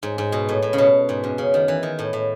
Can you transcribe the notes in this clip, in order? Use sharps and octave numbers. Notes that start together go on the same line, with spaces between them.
G#2
G#2
B2
A2
A2
C#3
B2
G#2
F#2
C#3
D#3
E3
D#3
A2
A2